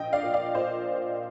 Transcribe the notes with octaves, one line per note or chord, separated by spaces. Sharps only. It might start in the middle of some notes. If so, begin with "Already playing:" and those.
Already playing: A#1 D#5 G5
D5 F5
A#2
D5 F5
A#2 C5 D#5